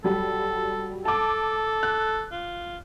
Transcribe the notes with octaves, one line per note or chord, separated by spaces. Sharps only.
F#3 G3 A4
A4 A5 D6
F#6
F4